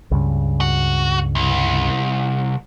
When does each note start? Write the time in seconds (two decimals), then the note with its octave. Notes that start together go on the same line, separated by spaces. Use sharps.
0.11 C#2 G2 C#3
0.61 F#4
1.35 C2